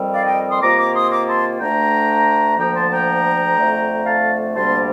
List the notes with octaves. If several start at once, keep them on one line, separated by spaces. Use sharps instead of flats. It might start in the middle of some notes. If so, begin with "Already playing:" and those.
Already playing: F2 D#3 G3 C4
D5 F5
D#5 G5
C6 D#6
C3 D#3 A#3 F4 A#5 D6
A#5 D6
C6 D#6
A#5 D6
A5 C6
D2 D3 A3 D4 G5 A#5
D2 D3 F3 A#3 G5 A#5
A5 C6
G5 A#5
F2 D3 A3
F5 A5
D2 C3 G3 A#3 D4 A5 C6